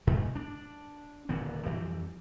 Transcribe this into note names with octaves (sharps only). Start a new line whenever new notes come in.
G2 B2 G#3 A3
D4
D#1 A#2 D3 B3
F2 E3 G3